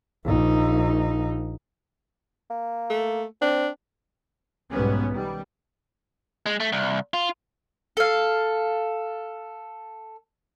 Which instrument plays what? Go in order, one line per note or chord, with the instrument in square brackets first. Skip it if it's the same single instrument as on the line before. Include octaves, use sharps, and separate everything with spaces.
[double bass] A#1 D#4
[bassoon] A#3
[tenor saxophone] A3
[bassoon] C4 [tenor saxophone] D4
[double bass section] B1 G#2 G3 B3 C#4
D#3 G3
[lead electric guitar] G#3
A3
C2
F4
[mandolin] A4 F5